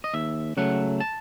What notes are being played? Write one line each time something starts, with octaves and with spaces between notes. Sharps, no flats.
D#5
D#2 E5
C#3 F#3 A3 F#5
A5